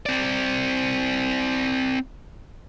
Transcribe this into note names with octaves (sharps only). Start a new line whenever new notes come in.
C4 D5